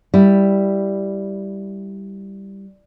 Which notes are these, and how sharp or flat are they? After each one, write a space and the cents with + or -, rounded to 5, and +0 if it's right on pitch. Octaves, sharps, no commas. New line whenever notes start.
G3 +0 E4 +0